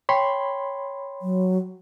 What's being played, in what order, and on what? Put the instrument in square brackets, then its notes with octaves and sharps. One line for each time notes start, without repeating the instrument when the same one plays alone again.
[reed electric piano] C#5 B5 C6 [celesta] G5
[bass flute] F#3